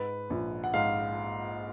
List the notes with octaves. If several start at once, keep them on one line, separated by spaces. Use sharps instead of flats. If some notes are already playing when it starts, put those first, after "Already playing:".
Already playing: G#2 B4
A#1
F#5
G#2 F5